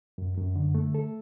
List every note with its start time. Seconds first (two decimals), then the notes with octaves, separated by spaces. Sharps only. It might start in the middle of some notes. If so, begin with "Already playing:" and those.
0.18 F#2
0.37 F#2
0.56 D3
0.75 A3
0.95 A4